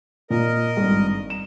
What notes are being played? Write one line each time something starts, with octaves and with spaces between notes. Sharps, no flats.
A#2 A#4 D#5
G#1 G2
E7